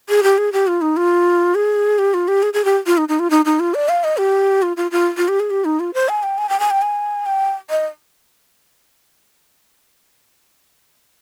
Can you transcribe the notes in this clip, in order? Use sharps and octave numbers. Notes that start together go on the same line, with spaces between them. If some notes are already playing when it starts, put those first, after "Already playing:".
G#4
G4
G#4
G4
F4
D#4
F4
G#4
G4
F4
G4
G#4
G#4
G4
F4
D#4
D#4
F4
D#4
D#4
F4
D5
F5
D#5
G4
F4
F4
F4
F4
G4
G#4
G4
D#4
F4
C5
G#5
G5
G#5
G5
G#5
G5
G#5
G5
D#5